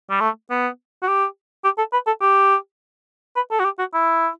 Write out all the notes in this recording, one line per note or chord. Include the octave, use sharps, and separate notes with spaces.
G3
A3
B3
F#4
G4
G4
A4
B4
A4
G4
B4
A4
F#4
G4
F#4
E4